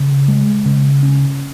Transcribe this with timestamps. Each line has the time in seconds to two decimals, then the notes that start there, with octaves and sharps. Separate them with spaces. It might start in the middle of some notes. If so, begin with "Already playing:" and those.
Already playing: C#3
0.28 G#3
0.65 C#3
1.03 C#4